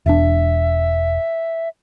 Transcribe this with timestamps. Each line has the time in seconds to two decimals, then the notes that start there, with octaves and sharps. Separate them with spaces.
0.06 E1 D4 E5